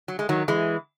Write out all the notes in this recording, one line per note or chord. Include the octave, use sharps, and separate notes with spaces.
F#3
G#3
D#3 F#3
E3 G#3